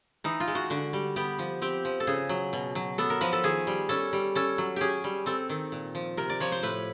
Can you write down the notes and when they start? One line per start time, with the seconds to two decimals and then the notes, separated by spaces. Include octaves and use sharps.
0.24 E3 D#4
0.40 F4
0.48 G#3
0.55 F#4
0.70 D3 F#4
0.93 G3
1.16 B3 G4
1.39 F3
1.62 C4 G4
1.85 F3
2.00 A4
2.07 C#3 G#4
2.29 F#3
2.53 B2
2.75 F#3
2.98 B3 A4
3.10 A#4
3.21 F3 B4
3.33 A4
3.43 D#3 G#4
3.67 G3
3.89 C#4 A4
4.13 G3
4.35 C#4 A4
4.58 F#3
4.76 C#4 G4 G#4
5.04 G3
5.26 C4 A4
5.49 D#3
5.72 A#2
5.95 F3
6.17 C3 A#4
6.29 D5
6.40 F3 C#5
6.52 C5
6.63 A2 B4